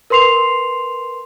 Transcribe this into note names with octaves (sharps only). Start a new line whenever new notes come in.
A#4 B4 C6 C7 F7